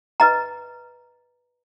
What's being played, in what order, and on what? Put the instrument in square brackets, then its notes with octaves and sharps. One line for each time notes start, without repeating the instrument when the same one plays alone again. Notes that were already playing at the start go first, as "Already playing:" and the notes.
[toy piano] B4 D#5 A#5